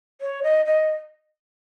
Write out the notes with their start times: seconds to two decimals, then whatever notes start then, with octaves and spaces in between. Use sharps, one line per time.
0.21 C#5
0.43 D#5
0.66 D#5